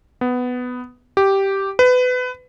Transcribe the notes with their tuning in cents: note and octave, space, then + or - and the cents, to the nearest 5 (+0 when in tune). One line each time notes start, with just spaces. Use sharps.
B3 +10
G4 -5
B4 +25